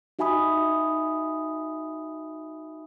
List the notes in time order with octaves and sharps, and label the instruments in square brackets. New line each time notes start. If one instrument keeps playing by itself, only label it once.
[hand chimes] D#4 F#4 E5 G#5 B5 D#6